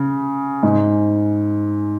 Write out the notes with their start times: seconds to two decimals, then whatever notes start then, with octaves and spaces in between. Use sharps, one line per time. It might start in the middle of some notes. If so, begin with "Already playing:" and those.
Already playing: C#3
0.63 G#2